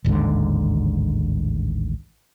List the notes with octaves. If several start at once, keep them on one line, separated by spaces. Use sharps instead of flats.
A1 D#2 G#2 D3